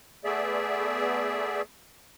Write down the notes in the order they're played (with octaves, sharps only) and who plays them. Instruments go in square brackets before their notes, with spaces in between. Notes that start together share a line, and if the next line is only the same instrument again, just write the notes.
[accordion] A3 B3 G#4 D5 E5